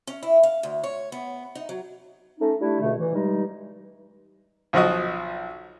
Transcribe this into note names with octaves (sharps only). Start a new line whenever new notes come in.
C#4
E4
F5
D2
C#5
B3
D#4
F#3
A3 C#4 D#4
G3 A3 D4 E4
C#2 B2 D3 A3
E3
G2 G3 G#3 D#4
B1 F3 F#4 D#5